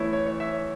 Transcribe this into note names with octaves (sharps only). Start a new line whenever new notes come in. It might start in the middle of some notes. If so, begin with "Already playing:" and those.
Already playing: E2 E3 A3 C#4 E4 C#5
C#5
C#5
E5
C#5